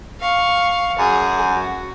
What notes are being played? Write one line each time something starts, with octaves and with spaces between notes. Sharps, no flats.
F5 C#6
F#2 G#4
F#4